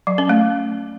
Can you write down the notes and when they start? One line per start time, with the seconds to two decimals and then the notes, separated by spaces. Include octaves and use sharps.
0.07 F#3
0.18 C#4
0.29 A3